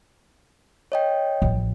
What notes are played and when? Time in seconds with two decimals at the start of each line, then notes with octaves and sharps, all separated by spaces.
0.92 C#5 D#5 G5
1.42 A1 F3